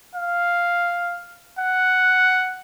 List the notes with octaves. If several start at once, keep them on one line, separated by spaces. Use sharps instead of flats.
F5
F#5